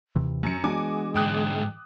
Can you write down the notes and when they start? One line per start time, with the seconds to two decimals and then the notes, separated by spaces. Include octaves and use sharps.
0.15 D#2 C3 E3
0.43 F#2 C#4 C#7
0.64 E3 G#3 B3 D4 F#4 G#5 D6
1.15 G#2 D3 G5 D#6 F#6